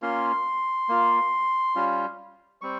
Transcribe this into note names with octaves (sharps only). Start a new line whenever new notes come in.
A#3 C#4 F4 C6
A#3 F4
G3 C#4 F4
G3 C4 C#6